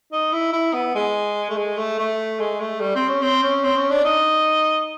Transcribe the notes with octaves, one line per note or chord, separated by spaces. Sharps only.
D#4
E4
E4
B3
G#3
A3
G#3
A3
A3
G#3
A3
G3
C4
C#4
C4
C#4
C4
C#4
D4
D#4